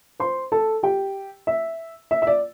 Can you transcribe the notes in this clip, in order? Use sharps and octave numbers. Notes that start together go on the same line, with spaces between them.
C5 C6
A4 A5
G4 G5
E5
E5
E5
D5